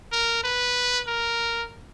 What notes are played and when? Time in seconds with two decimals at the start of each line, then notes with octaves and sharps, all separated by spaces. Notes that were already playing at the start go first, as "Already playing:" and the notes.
0.12 A#4
0.44 B4
1.07 A#4